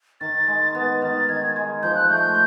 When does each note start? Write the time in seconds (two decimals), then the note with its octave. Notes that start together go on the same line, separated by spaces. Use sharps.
0.21 D#3 A6
0.47 G#3
0.75 B3
1.02 D#3 A6
1.29 D#3 G#6
1.56 G#3
1.83 F3 G6
1.95 F#6
2.09 A3 G6